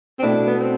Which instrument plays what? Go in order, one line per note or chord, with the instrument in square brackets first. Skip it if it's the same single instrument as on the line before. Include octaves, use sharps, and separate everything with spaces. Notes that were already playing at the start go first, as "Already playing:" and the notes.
[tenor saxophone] C4
[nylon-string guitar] B2 A3 E4 [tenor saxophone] D4
[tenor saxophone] B3
C4